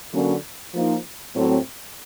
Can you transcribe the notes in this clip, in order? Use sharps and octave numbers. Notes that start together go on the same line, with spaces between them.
D3 F#3 A#3 C#4
F3 A#3 D#4
A2 F#3 A3 C4